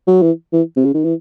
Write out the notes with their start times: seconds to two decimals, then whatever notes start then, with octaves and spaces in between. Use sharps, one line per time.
0.07 F#3
0.22 E3
0.53 E3
0.76 C3
0.85 C#3
0.94 D#3
1.04 E3